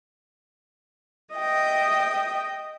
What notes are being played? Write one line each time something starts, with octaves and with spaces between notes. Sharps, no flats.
D#5 E5 G5